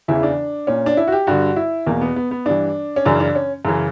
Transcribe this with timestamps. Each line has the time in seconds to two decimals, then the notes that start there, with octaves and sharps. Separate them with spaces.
0.08 E2 C#3 E3 E4
0.23 D4
0.67 A#2 C#4
0.86 D4
0.97 E4
1.07 F#4
1.12 G4
1.27 G2 D3 F#4
1.56 E4
1.86 E2 B2 A#3
2.01 B3
2.16 B3
2.31 B3
2.46 G2 E3 D4
2.96 C#4
3.05 F#2 C#3 E3 D4
3.20 D4
3.35 C#4
3.65 F#2 C#3 E3